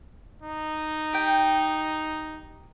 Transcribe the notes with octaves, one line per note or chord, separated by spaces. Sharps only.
D#4
G4 G5